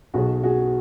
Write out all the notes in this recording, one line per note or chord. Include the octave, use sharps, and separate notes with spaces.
B1 B2 F#4 G#4
F#4 G#4